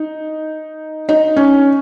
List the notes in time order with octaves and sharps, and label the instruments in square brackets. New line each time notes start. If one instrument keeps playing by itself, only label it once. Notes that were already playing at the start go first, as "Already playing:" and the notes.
Already playing: [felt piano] D#4
D#4
C#4